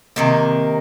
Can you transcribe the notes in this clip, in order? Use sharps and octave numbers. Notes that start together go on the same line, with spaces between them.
C3 D#3 A#3